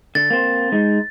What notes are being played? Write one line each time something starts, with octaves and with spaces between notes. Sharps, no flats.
D3 A6
A#3 C4 C5
G#3 D#4